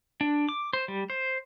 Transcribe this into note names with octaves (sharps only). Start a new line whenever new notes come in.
D4
D6
C5
G3
C5